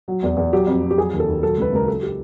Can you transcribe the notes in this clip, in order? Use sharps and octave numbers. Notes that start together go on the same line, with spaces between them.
F#3
E2
E2
F#3 G4
F2
F2
G4
F#3 G#4
D#2
A4
D#2
F#3 A4
C#2 B4
C#2 A#4
F#3 A4
G4